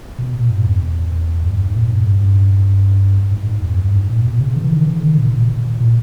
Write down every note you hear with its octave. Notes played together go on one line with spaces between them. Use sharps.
B2
A#2
G2
E2
G2
G2
G#2
A#2
G2
G2
G#2
G#2
E2
G2
G#2
A#2
B2
C#3
E3
D#3
C#3
D#3
A#2
A#2
A#2
A#2